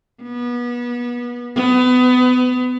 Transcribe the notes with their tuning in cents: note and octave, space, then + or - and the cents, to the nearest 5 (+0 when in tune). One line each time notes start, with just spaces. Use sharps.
B3 -30
B3 +30